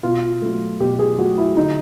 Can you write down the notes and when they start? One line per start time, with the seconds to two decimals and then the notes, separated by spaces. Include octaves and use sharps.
0.03 B2 F4
0.42 F#3 A3
0.80 B2 G4
0.99 G#4
1.18 F#3 A3 F#4
1.38 E4
1.56 D3 D#4